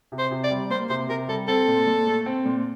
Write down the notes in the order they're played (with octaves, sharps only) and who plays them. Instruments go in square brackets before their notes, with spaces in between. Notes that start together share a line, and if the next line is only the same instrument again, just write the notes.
[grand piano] C3
[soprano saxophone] C5
[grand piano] C3
[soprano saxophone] D5
[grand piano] G3
[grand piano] A#3 [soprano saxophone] C5
[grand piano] C3 [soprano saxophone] C5
[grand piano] C3 [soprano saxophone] A#4
[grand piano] G3 [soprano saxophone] A4
[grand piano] C4 [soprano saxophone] A4
[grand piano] A#2
A#2
A3
C4
A#2